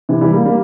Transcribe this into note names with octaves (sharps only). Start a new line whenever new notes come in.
C3 E3
E3 G3
G3 A#3
G3 A#3